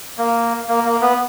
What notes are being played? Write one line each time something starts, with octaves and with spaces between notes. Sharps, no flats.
A#3
A#3
A#3
B3